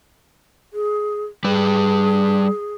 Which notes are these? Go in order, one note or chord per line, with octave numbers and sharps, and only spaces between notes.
G#4
G3 G#4 B4